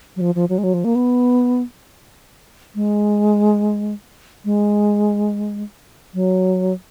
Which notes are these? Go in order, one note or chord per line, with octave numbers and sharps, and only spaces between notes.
F#3
F3
F3
F#3
G#3
F#3
F3
A#3
B3
G#3
G#3
F#3